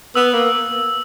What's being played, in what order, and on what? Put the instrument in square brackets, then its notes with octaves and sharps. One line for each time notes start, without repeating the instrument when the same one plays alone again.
[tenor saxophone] B3 [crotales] E6
[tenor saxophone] A#3